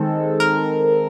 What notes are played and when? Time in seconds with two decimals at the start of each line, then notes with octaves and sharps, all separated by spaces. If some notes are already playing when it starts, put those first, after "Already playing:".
Already playing: D#3 G#3 C4 A4
0.40 A#4